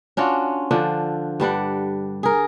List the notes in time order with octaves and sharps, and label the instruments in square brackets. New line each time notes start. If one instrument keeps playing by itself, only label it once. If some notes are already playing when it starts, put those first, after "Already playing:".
[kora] C#4 D4 F4 F#4
D3 F3 D4
G2 G3 D4 F#5
G#4 A#4